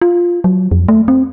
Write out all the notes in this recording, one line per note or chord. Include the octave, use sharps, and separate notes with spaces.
F4
F#3
F2
A3
C4